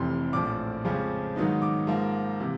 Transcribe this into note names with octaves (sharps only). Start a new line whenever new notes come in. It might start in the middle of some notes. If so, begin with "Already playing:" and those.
Already playing: F1 F2 C3 E3 C6
A#1 A2 F3 D6
F2 C#3 F3 G#3 C#4
G#2 D#3 F#3 B3 D#4
D6
G#2 F3 A#3
C3 E3